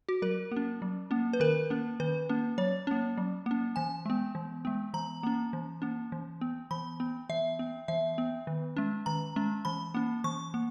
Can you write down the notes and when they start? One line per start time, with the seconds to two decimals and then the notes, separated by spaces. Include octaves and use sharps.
0.09 F#4
0.22 F#3 A#4
0.52 A#3 C#4
0.82 F#3
1.11 A#3 C#4
1.33 B4
1.40 D#3 A#4
1.70 A#3 C#4
2.00 D#3 B4
2.29 A#3 C#4
2.58 F#3 C#5
2.87 A#3 C#4
3.18 F#3
3.46 A#3 C#4
3.76 E3 G#5
4.06 G#3 B3
4.35 E3
4.65 G#3 B3
4.94 E3 A#5
5.23 A#3 C#4
5.53 E3
5.82 A#3 C#4
6.12 E3
6.41 B3
6.71 E3 B5
7.00 B3
7.29 E3 E5
7.59 B3
7.88 E3 E5
8.18 B3
8.47 D#3
8.77 G#3 C#4
9.06 D#3 A#5
9.36 G#3 C#4
9.65 E3 B5
9.95 A#3 C#4
10.24 E3 C#6
10.54 A#3